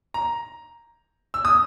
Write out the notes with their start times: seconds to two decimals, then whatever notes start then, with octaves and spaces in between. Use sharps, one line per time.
0.14 A#5
1.34 E6
1.45 D#6